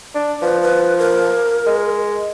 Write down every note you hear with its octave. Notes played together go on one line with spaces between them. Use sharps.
D4
F3 B4
B4
A#4
G#3